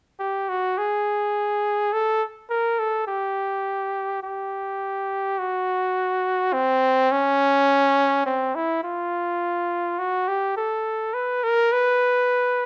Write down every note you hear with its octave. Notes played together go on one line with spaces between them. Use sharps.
G4
F#4
G#4
A4
A#4
A4
G4
G4
F#4
C4
C#4
C4
E4
F4
F#4
G4
A4
B4
A#4
B4